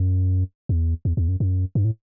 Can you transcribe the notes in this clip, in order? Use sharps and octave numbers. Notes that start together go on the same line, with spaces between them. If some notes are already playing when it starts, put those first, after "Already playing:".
Already playing: F#2
E2
E2
E2
F#2
F#2
G2
A2